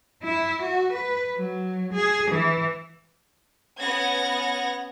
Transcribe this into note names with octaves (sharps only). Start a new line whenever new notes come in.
E4
F#4
B4
F#3
G#4
E3
B3 C#4 F#5 G#6 A#6